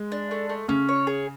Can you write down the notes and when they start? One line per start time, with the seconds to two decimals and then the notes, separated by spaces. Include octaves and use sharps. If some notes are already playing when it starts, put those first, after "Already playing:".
Already playing: G#3
0.12 D4
0.31 A3
0.49 A3
0.68 C#3 C#4
0.89 C#5
1.07 G#4